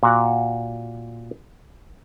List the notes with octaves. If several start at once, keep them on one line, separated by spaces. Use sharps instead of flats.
A#2 F#4 F#5